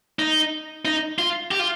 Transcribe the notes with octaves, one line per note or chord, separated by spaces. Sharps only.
D#4
D#4
F4
G4
F4